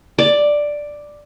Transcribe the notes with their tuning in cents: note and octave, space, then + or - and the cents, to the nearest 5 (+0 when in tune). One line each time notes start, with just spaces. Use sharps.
D5 +5